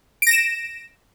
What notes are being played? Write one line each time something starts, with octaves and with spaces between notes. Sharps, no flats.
A#6 D7 E7